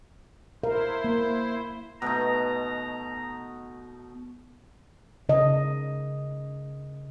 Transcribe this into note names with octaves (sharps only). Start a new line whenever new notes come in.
E4 A#4 C5 F5
A#3
B2 A3 D#4 A#5
C#3 D#5